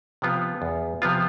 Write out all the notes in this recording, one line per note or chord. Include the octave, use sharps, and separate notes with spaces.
C3 F3 B3 F4
E2
C3 F3 B3 F4